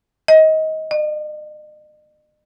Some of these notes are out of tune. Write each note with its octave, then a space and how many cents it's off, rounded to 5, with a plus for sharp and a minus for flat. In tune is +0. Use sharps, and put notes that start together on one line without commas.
D#5 +20
D#5 -45